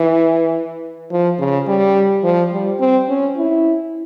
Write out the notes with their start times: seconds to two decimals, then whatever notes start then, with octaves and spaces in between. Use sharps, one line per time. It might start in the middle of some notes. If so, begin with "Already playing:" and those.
Already playing: E3
1.11 F3
1.39 C#3
1.67 G3
2.23 F3
2.52 G3
2.79 C4
3.08 C#4
3.36 E4